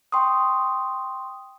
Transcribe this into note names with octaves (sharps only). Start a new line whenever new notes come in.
G5 C6 C#6 D#6